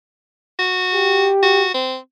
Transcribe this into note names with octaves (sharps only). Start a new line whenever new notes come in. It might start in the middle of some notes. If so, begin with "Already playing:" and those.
F#4
G4
F#4
C4